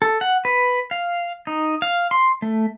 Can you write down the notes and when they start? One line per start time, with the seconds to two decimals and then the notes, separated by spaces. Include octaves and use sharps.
0.02 A4
0.21 F#5
0.45 B4
0.91 F5
1.47 D#4
1.82 F5
2.11 C6
2.42 A3